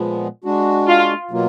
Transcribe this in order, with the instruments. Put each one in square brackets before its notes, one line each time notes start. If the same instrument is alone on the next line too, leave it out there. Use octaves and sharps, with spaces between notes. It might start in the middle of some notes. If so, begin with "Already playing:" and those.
Already playing: [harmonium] A#2 F3 G#3 B3
G#3 D4 F#4
[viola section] F4
[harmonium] B2 F#3 A#3 F4